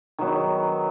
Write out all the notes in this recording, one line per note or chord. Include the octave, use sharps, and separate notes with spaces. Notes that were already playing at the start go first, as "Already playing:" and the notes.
D#3 F#3 B3